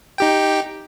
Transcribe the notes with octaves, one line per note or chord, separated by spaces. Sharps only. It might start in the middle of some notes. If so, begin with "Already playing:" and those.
D#4 G4 G5